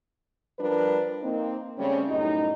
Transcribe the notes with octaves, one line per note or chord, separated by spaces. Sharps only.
F3 G3 D4 A#4 B4
A#3 C4 D#4
C#3 G3 A3 C4 C#4
F#2 A2 G3 D#4